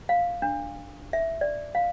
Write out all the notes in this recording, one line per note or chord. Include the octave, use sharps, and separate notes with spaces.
F5
D4
E5
D5
F5